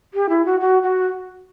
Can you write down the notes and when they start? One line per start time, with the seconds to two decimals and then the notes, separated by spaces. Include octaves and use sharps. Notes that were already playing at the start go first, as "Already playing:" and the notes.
0.14 G4
0.29 E4
0.45 F#4
0.60 F#4
0.83 F#4